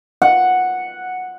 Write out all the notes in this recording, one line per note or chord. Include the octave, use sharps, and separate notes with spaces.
F#5